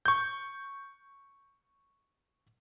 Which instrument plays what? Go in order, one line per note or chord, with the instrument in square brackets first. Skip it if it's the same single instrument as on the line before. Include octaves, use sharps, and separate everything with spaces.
[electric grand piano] C#6 G6